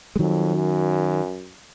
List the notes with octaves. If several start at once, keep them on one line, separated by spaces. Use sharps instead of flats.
G#3
F2 D#3 F#3
F#2